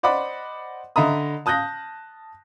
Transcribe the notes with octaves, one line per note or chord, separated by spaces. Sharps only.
C5 D5 D#5 F#5 B5 D6
D3 D#5 E5 A#5 B5 D#6
A5 D#6 F#6 G6 A#6